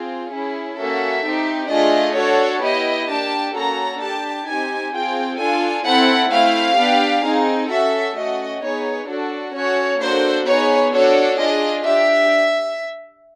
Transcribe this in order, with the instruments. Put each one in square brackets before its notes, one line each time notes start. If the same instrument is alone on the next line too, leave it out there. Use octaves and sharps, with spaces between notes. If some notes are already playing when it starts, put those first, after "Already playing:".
Already playing: [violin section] C4 F4 G#4
C#4 E4 G#4
A#3 C#4 F#4 A4 E5
C4 D#4 G4
A3 D4 F4 G#4 D#5
D4 F#4 A4 C#5
B3 E4 G4 D#5
A#3 D4 G4 A5
A#3 C#4 F#4 A4 A#5
D4 G4 A5
C4 D#4 G4 G#5
C4 F4 G#4 G5
D4 F4 A4 G#5
C4 E4 A4 F#5
A3 C4 E4 F5
B3 D4 G4
C4 D#4 G#4
C#4 F#4 A4 E5
A3 C#4 F#4 D#5
B3 D#4 G#4 C#5
D4 F#4 A4
C#4 F#4 A4 C#5
A#3 D4 F#4 A4 C5
B3 D#4 G#4 C#5
D4 F#4 A4 C#5
D4 F4 G#4 D#5
D4 G4 E5